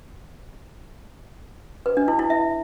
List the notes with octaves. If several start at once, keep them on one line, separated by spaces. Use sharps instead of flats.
B4
D4
E4
E4
E5